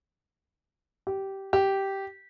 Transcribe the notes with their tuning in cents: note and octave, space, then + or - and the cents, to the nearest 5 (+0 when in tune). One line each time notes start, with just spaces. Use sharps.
G4 -15
G4 -10